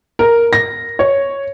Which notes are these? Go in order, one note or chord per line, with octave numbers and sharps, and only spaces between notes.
A#4
A#6
C#5